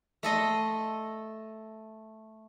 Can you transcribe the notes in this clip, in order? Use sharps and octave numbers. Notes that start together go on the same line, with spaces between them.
A3 A4 D#5 C6